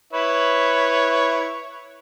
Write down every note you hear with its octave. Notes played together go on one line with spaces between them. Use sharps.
E4 B4 C#5